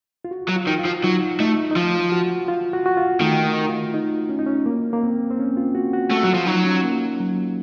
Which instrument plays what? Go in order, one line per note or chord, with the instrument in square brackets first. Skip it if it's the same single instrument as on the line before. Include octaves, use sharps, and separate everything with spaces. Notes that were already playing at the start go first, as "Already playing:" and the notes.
[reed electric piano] F4
F#4
[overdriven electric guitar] F#3
[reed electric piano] F4
[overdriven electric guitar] D#3
[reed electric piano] F4
[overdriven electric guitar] F3
[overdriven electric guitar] F#3 [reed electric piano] D#4
[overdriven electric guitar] A3 [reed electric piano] D#4
[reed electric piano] D#4
[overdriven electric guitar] F3 [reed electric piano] F4
[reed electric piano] F#4
F4
F#4
F#4
F4
[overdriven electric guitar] D#3 [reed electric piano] A3
[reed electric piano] F#4
F4
D#4
C#4
D#4
C#4
A#3
A#3
C4
C4
C#4
F4
F#4
F#4
[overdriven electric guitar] A3 [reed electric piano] F#4
[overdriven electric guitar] F#3
[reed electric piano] F4
[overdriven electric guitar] F3
[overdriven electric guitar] F#3 [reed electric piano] D#4
[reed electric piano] C#4
A#3
F#3